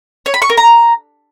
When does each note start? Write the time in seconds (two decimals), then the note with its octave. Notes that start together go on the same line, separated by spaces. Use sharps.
0.26 C#5
0.34 B5
0.42 C#6
0.50 A#4
0.57 A#5